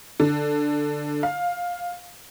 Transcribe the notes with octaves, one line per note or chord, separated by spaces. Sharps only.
D3
F5